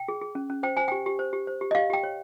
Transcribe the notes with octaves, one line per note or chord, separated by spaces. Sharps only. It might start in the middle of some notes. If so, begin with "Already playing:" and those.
Already playing: G5
G#4
G#4
C#4
C#4
C5 G5
C5 G#5
G4 G5
G4
C5
G4
C5
G4
D#5
G4 F5
G4 G5
C#5